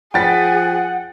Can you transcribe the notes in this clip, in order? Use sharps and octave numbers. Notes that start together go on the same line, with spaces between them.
F3 G#4 F#5 G5 A6 B6